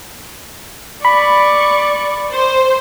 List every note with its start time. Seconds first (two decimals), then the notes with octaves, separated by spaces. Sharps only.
1.05 D5 B5 C#6
2.31 C5